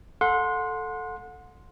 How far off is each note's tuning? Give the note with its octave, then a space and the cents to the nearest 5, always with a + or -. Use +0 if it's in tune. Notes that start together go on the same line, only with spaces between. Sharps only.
A4 +0 F#5 -30 C6 +0